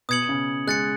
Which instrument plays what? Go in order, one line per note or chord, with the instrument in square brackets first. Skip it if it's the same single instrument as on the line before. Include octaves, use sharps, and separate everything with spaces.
[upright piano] B2 [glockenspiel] D#6 G#6 C#7 F#7
[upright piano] C#3
[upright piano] G#3 [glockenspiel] F#6 A6 C#7